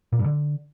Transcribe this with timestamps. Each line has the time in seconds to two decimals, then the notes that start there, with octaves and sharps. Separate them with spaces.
0.13 A#2
0.19 G2
0.26 D3